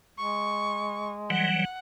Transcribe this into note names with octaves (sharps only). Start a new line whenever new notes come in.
G#3 C#6
E3 F#3 G3 F#5